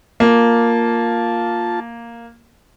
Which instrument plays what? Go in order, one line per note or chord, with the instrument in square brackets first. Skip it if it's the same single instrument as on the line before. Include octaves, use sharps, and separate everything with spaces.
[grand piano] A#3 [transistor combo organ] F4 A5